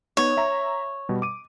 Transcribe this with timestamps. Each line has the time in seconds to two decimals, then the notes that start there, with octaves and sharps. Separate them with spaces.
0.17 B3 D#4 C#5
0.37 E5 A#5
1.09 B2 G3
1.22 D6 D#7